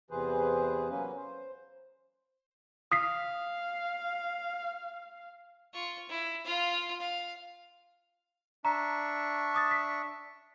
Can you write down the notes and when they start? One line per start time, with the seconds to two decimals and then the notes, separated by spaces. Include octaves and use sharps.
0.10 E2 C3 E3 G#4 B4 C5
0.89 F#3 A#3 C#4 B4
1.17 C5
2.92 F5 D#6 B6 C7
5.73 F4 C#6
6.09 E4
6.45 F4 F5
7.00 F5
8.65 D4 E5 A#5 C#6
9.55 D6 D#6 A6
9.71 B6